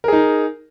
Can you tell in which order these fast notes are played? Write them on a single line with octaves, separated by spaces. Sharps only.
A#4 G#4 D#4